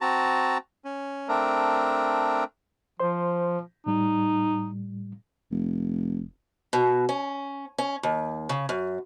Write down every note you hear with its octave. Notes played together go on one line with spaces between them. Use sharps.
C4 F#4 A5 A#5
C#4
A3 C4 D4 A#4
F3 C5 C6
A2 G3 D#4
F1
B2
C#4
C#4
D#2
C#3
F#2